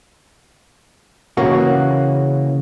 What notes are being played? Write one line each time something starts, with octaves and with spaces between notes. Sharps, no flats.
C#3 E3 A#3 F#4